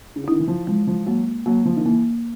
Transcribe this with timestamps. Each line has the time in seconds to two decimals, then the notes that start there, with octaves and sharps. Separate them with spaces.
0.16 C#3
0.24 D3
0.28 D#3 E4
0.39 E3
0.48 F3
0.67 F3 G#3
0.87 F3
1.06 F#3 A#3
1.46 F#3 A#3
1.65 F3
1.77 D#3
1.86 E3 A#3